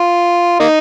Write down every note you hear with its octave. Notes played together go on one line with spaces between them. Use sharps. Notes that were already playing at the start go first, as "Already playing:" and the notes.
Already playing: F4
A#3 D#4